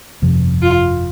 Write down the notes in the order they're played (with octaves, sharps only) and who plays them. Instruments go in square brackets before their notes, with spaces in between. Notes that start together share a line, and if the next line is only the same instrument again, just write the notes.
[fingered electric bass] G1 F2 C3 F3
[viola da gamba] F4